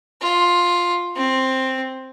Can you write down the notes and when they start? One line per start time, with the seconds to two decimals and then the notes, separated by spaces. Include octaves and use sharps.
0.21 F4
1.16 C4